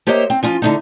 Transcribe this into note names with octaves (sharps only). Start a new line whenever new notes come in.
A#3 G4 C5 C#5 D#5 E5
C4
F3 C#4 F4
D3 A3 D#4